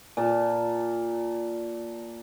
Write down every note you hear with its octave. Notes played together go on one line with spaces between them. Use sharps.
A#2 A5